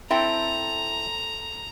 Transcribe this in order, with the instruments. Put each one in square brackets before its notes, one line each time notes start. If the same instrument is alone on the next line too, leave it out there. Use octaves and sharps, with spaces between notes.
[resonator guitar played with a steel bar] C4 A4 G5 [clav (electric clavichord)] E4 [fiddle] A#5